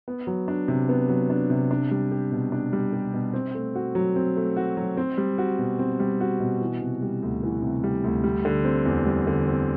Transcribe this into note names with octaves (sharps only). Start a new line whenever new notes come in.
B3
F#3
D4
C3
B3
F#3
D4
C3
D4
G3
G4
B2
D4
G3
G4
B2
C4
A3
F#4
F#3
C4
A3
F#4
F#3
C4
G3
F#4
B2
C4
G3
F#4
B2
E3
C3
G3
D2
E3
C3
G3
D2
G3
D3
C4
E2
G3
D3
C4